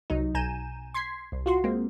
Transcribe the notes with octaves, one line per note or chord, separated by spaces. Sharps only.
C2 F#3 D#4
B1 G#5 A#5 G6 D#7 E7
C6 G#6 B6 C7
C2
F4 F#4 C6
G#3 A#3 C4